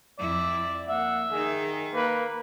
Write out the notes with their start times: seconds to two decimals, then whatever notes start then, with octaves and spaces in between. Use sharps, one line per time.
0.19 F2 E4 D5
0.89 A#3 E5 F#5
1.31 D#3 D#4 G#4
1.94 A#3 B4